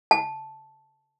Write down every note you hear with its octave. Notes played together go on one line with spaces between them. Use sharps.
A5